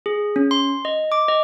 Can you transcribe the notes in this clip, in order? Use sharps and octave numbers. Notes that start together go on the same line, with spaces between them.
G#4
C#4
C6
D#5
D6
D#5